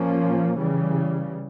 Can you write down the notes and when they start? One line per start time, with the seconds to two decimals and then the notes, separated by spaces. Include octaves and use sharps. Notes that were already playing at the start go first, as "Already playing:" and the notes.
Already playing: A#2 F3 A#3 C#4
0.57 C#3 E3 G3